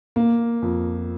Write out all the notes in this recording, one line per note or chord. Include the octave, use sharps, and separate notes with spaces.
A#3
F2